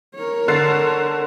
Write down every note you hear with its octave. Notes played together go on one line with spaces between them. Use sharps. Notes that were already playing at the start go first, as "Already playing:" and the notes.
A#4 C#5
D3 A6 C7